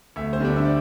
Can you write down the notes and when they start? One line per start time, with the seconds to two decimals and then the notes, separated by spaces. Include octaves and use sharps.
0.16 D2 E5
0.33 C5
0.40 D3 G3 D4
0.56 E5
0.65 D5